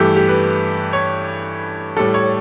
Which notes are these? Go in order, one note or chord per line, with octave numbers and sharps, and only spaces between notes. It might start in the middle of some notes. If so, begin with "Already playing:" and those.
Already playing: G2 E3 A3 G4
G4
B4
C#5
A2 G3 A4
C#5